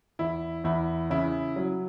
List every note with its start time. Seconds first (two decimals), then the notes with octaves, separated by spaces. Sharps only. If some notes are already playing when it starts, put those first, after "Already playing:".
0.19 E2 E4
0.64 E2 E4
1.10 C#3 E4
1.56 F#3